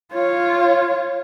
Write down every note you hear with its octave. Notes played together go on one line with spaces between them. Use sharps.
F4 C#5